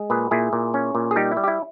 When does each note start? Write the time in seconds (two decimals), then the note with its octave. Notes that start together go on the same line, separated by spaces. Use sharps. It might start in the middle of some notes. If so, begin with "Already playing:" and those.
Already playing: G#3
0.10 A#2 G#4 B4
0.31 A#2 E4 G#4
0.53 A#2
0.74 C#4
0.95 A#2
1.11 G#4
1.16 G3 D#4 G4
1.32 E4
1.37 G3
1.44 G4
1.48 E4